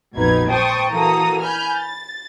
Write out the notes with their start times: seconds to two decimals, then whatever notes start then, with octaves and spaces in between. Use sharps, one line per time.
0.15 A#1 F2 B2 D#4 B4 G#6
0.49 C5 G5 A5 C#6 D#6
0.90 E3 A#3 F#4 A4 A#5 D#6
1.43 G#5 B5 F6 G6
1.77 A6